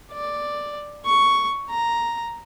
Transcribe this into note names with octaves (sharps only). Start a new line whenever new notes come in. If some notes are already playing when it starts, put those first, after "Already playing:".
D5
C#6
A#5